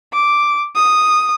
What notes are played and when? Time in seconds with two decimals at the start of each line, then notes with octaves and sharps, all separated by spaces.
0.13 D6
0.76 D#6